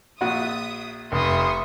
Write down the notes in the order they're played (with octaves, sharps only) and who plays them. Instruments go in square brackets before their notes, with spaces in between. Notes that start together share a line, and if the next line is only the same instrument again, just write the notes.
[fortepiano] A#1 F#4 [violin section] E5 D#6
[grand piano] F1 [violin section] E5 C#6 [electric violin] C6 D#6